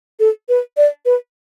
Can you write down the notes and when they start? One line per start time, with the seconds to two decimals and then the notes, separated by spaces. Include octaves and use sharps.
0.20 A4
0.49 B4
0.77 D5
1.06 B4